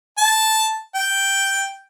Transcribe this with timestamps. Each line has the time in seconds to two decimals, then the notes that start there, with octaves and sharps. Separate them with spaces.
0.18 A5
0.95 G5